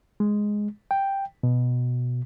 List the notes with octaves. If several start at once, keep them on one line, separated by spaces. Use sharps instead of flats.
G#3
G5
B2